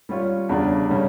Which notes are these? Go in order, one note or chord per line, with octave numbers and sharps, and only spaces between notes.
G3 C#4 F4 C#5
E2 C#3 G3 D4
C#3 G3 C#4